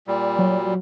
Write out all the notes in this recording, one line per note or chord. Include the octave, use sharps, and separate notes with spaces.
A#2 G3
F#3